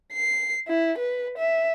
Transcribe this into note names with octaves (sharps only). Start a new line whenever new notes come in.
C7
E4
B4
E5